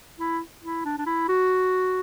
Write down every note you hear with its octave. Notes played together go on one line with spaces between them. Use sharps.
E4
E4
D4
D4
E4
F#4